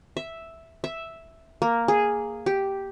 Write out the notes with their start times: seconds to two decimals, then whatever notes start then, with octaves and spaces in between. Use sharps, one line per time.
0.17 E5
0.84 E5
1.62 A#3
1.88 G#4
2.46 G4